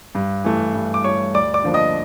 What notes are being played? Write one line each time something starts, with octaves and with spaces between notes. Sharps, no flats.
G2
E3 A3
G2
D6
E3 A3 C#5 C#6
D2 D5 D6
D5 D6
D3 F3 A#3 D4
D#5 D#6